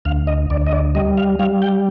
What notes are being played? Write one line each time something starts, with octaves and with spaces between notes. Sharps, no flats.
D2 F5
D#5
D2 D5
D#5
D5
G3 D#5
F5
G3 F5
G5